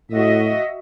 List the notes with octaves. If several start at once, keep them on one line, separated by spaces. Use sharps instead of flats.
A2 F#4 D#5 E5